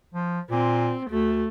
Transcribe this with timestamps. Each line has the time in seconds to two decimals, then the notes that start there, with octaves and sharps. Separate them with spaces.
0.14 F3
0.50 A#2 C4
1.10 D2 A3